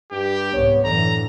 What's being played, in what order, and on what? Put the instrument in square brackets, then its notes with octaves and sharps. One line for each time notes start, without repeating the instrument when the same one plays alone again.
[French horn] G2 [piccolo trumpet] G4
[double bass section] C2 G#2 B3 [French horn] C#5
[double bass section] F#2 A2 E3 [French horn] D3 [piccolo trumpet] A#5